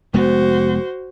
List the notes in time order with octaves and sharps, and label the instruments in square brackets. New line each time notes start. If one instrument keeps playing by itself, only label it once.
[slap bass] F1 G#3 B3 [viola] F#4 C5